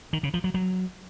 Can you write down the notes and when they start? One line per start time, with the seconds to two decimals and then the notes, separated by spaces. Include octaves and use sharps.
0.13 D#3
0.23 C#3
0.34 F3
0.44 F#3
0.54 F#3